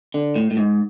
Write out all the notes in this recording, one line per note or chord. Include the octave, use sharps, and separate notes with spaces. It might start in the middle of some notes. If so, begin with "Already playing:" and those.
D3
A2
A2
G#2